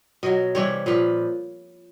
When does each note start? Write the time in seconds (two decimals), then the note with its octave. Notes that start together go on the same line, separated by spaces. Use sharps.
0.23 B2 F#3 D#5
0.55 C3 E3 G3 C#5
0.86 A#2 F3 B4